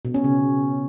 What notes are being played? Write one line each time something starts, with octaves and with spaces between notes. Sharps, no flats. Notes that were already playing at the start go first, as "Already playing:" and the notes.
B2
C#4
C#3